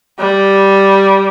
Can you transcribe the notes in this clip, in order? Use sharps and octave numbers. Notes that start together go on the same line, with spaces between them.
G3